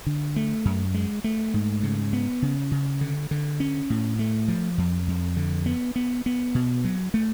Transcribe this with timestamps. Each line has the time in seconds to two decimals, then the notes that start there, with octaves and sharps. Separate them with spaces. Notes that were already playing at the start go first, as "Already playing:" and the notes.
0.06 D3
0.36 A3
0.65 F#2
0.94 G#3
1.24 A3
1.54 G#2
1.83 C#3
2.13 B3
2.42 C#3
2.71 C#3
3.01 D3
3.31 D3
3.60 C#4
3.90 A2
4.19 A3
4.48 F3
4.78 F2
5.08 F2
5.37 D3
5.66 B3
5.96 B3
6.26 B3
6.55 B2
6.84 F#3
7.14 A3